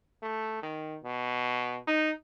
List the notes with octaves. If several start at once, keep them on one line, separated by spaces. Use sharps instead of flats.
A3
D#3
B2
D#4